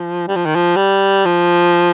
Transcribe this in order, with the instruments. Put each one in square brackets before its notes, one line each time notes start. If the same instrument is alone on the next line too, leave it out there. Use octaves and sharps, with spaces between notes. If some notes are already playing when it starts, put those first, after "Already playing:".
Already playing: [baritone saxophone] F3
G3
F3
D#3
F3
G3
F3